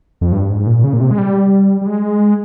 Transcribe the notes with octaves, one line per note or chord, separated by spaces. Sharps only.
F2
G2
G#2
A#2
C#3
A#2
C3
G#3
G3
G3
G#3